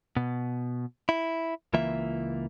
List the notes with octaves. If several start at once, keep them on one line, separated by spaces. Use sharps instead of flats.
B2
E4
C#2 E3 A#3 F4 E5